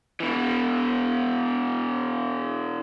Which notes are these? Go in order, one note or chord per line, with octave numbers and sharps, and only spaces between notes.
B2 E3